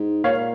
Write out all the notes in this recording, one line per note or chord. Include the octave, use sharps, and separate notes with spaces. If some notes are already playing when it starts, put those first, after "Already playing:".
Already playing: G#2
A#2 C#5 F5